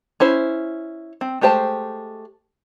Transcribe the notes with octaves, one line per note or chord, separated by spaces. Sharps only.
C#4 E4 C5
C4
G#3 A3 G4 C5 A5